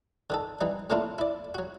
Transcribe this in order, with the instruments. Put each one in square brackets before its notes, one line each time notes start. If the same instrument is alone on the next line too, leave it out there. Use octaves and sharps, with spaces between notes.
[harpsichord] D3 D#3 A4
E3 G3 D#4
A2 D3 A#3 D4 E4 F4
E4 D5
F#3 F#4